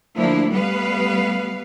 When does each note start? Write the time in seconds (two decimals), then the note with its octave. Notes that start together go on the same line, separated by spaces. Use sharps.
0.16 D2 F3 A#3 D4 E4
0.51 G3 A3 B3 B4 F5